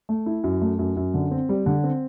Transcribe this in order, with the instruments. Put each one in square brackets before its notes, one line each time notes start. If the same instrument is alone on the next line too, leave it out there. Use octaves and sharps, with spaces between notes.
[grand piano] A3
E4
F#2
A3
F#2
F#2
D3
C4
G3
D3
C4